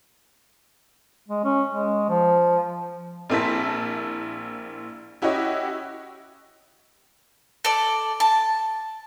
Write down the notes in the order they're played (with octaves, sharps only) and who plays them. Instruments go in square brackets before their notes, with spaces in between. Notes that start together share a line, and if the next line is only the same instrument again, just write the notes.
[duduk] G#3
C#4
G#3
F3
[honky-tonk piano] A#1 A#3 C4 E4 A5 B6
C#4 E4 F#4 G4 C#5 D#5
[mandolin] A4 D5
A5